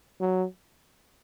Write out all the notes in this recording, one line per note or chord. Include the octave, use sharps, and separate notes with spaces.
F#3